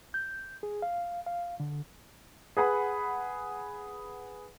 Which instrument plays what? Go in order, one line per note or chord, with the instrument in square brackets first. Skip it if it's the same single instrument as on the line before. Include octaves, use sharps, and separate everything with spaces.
[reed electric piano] G6
G#4
F5
F5
D3
[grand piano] G#4 B4 F#5 B5